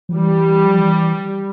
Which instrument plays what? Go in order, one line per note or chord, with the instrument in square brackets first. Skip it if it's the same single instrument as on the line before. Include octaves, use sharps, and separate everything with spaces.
[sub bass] F3
[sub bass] E3 [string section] G3
[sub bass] F3
E3